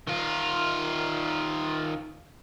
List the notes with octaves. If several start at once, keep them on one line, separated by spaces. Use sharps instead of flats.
D#3 F4